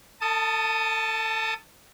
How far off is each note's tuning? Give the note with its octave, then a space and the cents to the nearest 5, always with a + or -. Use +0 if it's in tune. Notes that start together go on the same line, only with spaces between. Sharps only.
A4 +35 A5 +0 D#6 +0